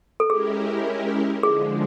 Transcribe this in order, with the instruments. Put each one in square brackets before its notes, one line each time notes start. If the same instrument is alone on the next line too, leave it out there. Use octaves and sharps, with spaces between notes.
[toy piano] A4
[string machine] G#3 C#4 E4 G4 A#4 [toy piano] G#4
[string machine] D3 F3 G#3 [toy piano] G#4